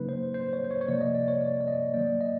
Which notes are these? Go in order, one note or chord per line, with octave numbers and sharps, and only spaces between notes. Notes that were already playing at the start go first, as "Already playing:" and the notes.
Already playing: C#3 F#3 A#3 D#4 B4
C5
C5
C#5
C5
C#5
C#5
C3 F3 A#3 D5
D#5
D5
C#5
D5
D5
D#5
D#3 F#3 A#3 D5
D#5